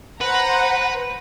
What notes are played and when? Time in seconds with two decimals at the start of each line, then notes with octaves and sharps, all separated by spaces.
0.21 B4 C5 F#5 A#5